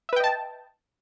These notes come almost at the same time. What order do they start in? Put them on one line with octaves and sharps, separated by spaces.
E5 B4 G5 D#5 A5